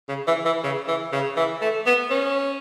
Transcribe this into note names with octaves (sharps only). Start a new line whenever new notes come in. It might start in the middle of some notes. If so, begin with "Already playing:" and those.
C#3
E3
E3
C#3
E3
C#3
E3
A3
B3
C#4